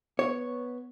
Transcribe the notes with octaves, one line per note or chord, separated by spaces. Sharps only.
B3 C#5